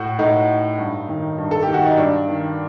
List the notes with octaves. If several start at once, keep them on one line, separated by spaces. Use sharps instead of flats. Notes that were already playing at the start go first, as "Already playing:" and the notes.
Already playing: A2 F#4
A2 D#4
G2
D#3
G2
A4
G4
D#3
F#4
D#4
G2 D4
D#3